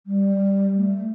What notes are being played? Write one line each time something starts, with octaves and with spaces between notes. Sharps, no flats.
G3
A3